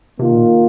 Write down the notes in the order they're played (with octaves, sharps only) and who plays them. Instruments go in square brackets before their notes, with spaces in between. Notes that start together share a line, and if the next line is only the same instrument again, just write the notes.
[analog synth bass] C3 [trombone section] D#3 A#3 F4
[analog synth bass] A#2